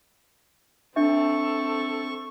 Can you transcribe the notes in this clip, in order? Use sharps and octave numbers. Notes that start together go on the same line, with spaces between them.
C4 D4 A4 E5 C#6